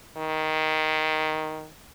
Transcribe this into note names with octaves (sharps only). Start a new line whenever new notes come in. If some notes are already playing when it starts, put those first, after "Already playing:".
D#3